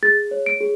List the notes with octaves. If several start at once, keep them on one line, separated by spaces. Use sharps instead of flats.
G#4 A6
C#5
D7
G#4